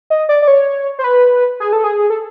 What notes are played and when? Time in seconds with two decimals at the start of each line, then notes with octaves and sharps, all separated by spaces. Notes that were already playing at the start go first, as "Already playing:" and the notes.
0.10 D#5
0.29 D5
0.42 D5
0.48 C#5
0.99 C5
1.04 B4
1.60 G#4
1.73 A4
1.84 G#4
2.10 A4